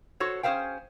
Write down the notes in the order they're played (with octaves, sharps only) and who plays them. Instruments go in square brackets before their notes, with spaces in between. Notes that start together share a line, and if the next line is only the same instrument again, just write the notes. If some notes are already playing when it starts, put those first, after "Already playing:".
[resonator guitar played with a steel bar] F#4 A4 C5 C#5
C#4 G#4 A#4 C5 F5 G5